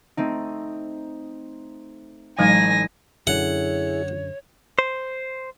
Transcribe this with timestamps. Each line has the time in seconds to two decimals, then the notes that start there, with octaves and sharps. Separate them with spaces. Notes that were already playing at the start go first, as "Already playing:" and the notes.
0.17 A3 C4 D#4
2.39 A1 F#3 G#3 D#4 G#5 G#6 A#6
3.27 F#2 D3 E4 G#4 C#5 F#5
4.79 C5